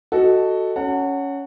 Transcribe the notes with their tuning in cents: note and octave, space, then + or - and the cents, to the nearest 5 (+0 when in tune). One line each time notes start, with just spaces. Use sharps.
F#4 +10 A4 +5 D#5 +0
C#4 +10 F#5 +0 A5 +45